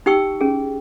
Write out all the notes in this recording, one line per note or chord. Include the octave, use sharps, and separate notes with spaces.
D#4 G4 G5 C#6 E6
C#4 G#4